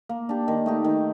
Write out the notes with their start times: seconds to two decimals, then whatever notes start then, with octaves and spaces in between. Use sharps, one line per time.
0.09 A#3
0.29 D4 G4
0.48 D#3
0.66 A3 D#4 G4
0.85 D#3